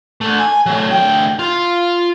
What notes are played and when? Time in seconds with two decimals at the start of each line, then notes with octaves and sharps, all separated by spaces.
0.21 D3 A3
0.39 G#5
0.66 F#3 A3
0.91 D2 G5
1.39 F4